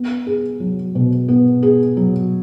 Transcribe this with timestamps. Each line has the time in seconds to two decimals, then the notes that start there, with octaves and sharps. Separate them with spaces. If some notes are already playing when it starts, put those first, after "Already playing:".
Already playing: B3
0.26 G#4
0.60 F#3
0.95 B2
1.28 B3
1.63 G#4
1.97 F#3